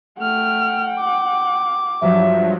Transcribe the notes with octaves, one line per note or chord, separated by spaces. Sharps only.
A3 F#5 G5 F6
D6
G2 F3 F#3 E5